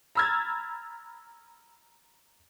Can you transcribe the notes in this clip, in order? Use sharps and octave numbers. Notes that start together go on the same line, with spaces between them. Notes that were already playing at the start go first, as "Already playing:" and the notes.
A#5 B5 E6 F6 G#6 A6